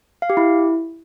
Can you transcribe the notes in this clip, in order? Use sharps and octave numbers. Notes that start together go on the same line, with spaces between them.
F5
G4
E4